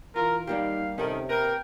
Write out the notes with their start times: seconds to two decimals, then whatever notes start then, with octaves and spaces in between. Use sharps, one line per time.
0.16 E3 F4 A#4
0.47 G3 A#3 D#4 G4 F5
0.98 G2 C3 D#3 C#4 A4
1.29 A#3 A#4 B4 G5